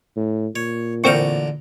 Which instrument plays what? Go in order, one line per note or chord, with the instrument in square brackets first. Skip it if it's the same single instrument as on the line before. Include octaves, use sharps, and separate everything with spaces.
[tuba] A2
[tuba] A#2 [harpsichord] C#5
[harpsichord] A1 D3 A#5 [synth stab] A#3 C4 C#6